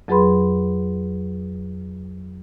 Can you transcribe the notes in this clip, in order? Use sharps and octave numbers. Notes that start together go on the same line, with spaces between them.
F2 F#3 G#4 B4 B5 C6